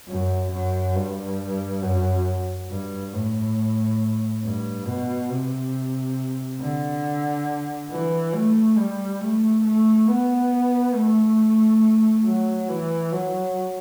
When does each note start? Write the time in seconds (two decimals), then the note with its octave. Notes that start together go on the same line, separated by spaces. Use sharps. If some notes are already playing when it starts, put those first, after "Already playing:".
0.09 F#2
0.52 F#2
0.96 G2
1.82 F#2
2.70 G2
3.13 A2
4.44 G2
4.87 B2
5.30 C3
6.61 D3
7.91 E3
8.35 A3
8.78 G3
9.22 A3
9.65 A3
10.08 B3
10.95 A3
12.25 F#3
12.69 E3
13.12 F#3